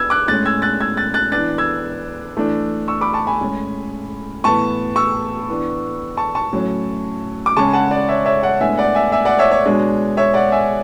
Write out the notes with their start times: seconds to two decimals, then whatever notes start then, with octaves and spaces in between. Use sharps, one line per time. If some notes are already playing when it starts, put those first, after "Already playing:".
Already playing: B3 E6 G#6
0.10 D6 F#6
0.28 A2 G#3 C#4 F#6 A6
0.45 E6 G#6
0.62 F#6 A6
0.81 E6 G#6
0.97 F#6 A6
1.14 F#6 A6
1.32 E3 B3 D4 F#6 A6
1.58 E6 G#6
2.37 E3 A3 D4
2.88 C#6 E6
3.01 B5 D6
3.14 A5 C#6
3.27 G#5 B5
3.40 A2 G#3 C#4
4.44 A2 E3 B3 A5 C#6
4.96 C#6 E6
5.48 E3 B3 D4
6.17 A5 C#6
6.35 A5 C#6
6.53 A2 F#3 C#4
7.46 D6
7.57 C#3 G#3 C#4 A5 C#6
7.73 F#5 A5
7.91 D5
8.09 C#5 E5
8.26 C#5 E5
8.43 D5 F#5
8.60 A2 G#3 B3 D4 E5 G#5
8.78 D5 F#5
8.95 E5 G#5
9.12 E5 G#5
9.25 D5 F#5
9.39 C#5 E5
9.51 C#5
9.65 B2 G#3 D4
10.17 C#5 E5
10.34 D5 F#5
10.52 E5 G#5